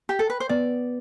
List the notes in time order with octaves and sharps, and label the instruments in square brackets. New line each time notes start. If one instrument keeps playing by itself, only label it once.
[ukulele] G4
A4
B4
C5
[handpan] B3 [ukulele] D5